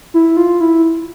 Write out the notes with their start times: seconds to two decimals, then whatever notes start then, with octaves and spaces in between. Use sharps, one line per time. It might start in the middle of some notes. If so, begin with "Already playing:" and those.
0.14 E4
0.37 F4
0.60 E4